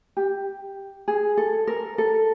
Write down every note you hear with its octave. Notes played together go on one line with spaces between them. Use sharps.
G4
G#4
A4
A#4
A4